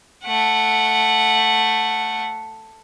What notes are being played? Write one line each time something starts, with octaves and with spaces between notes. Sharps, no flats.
A3 F#5